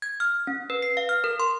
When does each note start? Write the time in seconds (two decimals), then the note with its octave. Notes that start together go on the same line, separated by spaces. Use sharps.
0.02 G#6
0.20 F6
0.47 C#4
0.70 B4
0.82 C7
0.97 F5
1.09 F6
1.24 A#4
1.40 C6